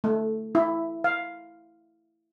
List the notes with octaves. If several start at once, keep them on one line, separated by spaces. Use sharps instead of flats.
A3
E4
F5